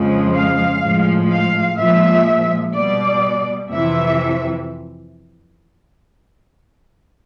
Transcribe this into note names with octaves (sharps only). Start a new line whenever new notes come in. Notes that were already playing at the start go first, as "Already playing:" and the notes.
Already playing: F2 C#3 F3 G#3
F5
A2 F3 G#3
F5
A#2 F3 G#3 E5
B2 G3 D5
F2 C3 E3 E5